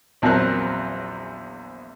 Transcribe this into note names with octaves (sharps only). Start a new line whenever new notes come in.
A#1 E2 F#3 C4 A#4 F#6